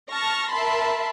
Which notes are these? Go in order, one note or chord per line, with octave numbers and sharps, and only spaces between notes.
A5 C#6 F6 A#6
A#4 E5 A5 B5 C6